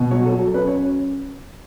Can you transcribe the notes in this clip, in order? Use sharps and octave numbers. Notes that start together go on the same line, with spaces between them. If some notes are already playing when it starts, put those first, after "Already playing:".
Already playing: B2
F#3 C#5
A4
F#3
A4
C#4 B4
C#5